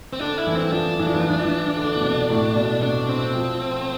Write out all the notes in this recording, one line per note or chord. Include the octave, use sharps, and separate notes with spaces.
C4
D3 D4
E4
E3
C4
F3 D4
E3
F3
E3
F3
E3
F3
E3
D3
B2
C3
A2
B2
C3 D4
C4
F3